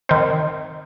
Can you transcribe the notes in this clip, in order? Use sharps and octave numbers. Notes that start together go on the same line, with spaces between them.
D#3 C4